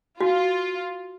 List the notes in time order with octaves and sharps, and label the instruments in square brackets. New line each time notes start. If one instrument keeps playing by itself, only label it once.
[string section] F4 [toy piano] F#4